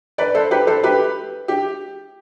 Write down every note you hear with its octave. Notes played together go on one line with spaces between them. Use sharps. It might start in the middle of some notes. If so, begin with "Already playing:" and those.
B4 D5
A4 C5
G4 B4
A4 C5
G4 B4
G4